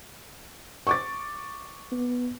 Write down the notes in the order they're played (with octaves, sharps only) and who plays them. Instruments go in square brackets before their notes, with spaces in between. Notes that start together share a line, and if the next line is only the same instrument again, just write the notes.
[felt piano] C#6 D6 A6
[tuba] B3